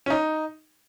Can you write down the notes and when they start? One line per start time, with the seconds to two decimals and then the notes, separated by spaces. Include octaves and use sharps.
0.06 C#4
0.10 D#4